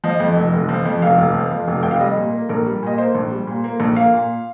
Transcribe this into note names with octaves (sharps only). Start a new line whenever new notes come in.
F3 D#5
F2
F1
F1
F3
F2
F1 F5
F1
F3
F2
F1
F1 G5
F5
G3 D#5
A#2
A#3
A#1 A#4
G3
A#2 D#5
A#3 C5
A#1
G3
A#2
A#3
A#1
A#3 F5
A#2